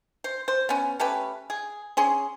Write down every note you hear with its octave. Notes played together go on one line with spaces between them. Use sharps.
C5
C5
B3 C#4
A3 C#4 G4 B4
G#4
C#4 G#4 C6